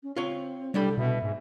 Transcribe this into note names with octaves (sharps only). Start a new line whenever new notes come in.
C#4
C4 F4 C#5
C2 G3 D4 A4 B5
B2 E5
G#2